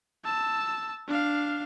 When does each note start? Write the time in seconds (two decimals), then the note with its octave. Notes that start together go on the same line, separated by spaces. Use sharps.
0.25 A5 E6
1.08 D4 F5